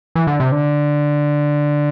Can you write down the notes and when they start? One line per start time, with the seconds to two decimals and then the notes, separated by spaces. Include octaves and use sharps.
0.15 E3
0.27 D3
0.40 C3
0.52 D3